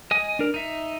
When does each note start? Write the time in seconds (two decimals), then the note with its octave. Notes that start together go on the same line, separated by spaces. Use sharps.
0.11 D#5 G#5 D#6
0.39 D4 A#4
0.54 D#4 E5